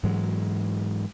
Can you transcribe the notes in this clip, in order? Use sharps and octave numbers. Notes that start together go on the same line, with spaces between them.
G#2 E3 F#3 G#3